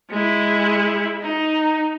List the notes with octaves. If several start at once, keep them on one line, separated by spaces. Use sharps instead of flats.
G#3 E4
D#4